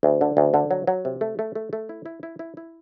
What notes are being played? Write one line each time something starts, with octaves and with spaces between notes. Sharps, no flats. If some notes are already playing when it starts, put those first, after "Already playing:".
D2
D3
D2
D3
F#3
F#3
C3
A3
A3
A3
A3
E4
E4
E4
E4
E4